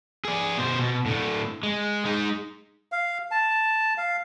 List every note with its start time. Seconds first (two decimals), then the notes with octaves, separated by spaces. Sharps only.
0.25 G#4 D5
0.58 B2 C5
0.79 B2
1.06 A2 D3
1.63 G#3
2.05 G#3 D#4
2.92 F5
3.31 A5
3.98 F5